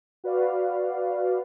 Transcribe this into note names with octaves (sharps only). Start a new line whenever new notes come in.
F#4 B4 D5 F5